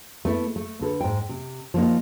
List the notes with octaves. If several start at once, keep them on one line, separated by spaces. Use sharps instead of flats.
A3 B3 E4
A3
D3 A4 B4
G#2 G5
C3
F3 A#3 D#4